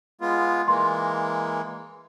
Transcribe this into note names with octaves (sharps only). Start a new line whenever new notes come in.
G#3 B3 F4
E3 G#3 A#3 C6